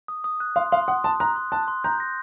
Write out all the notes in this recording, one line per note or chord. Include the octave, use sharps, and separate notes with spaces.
D#6
D#6
F#6
F5 C6
F5 C6
F#5 D#6
A5 C6
A#5 F#6
C6
A5 F#6
C6
A#5 G6
A#6